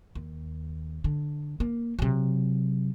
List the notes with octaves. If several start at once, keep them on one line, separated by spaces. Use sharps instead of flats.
D#2
D3
A#3
C3 F#3